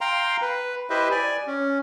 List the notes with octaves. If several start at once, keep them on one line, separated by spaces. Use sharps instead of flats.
F5 G5 A#5 C6
B4
E4 G4 B4 C5 D#5 E5
D5 G#5
C#4